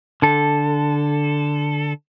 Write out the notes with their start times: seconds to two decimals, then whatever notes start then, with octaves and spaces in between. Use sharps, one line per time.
0.22 D3 A4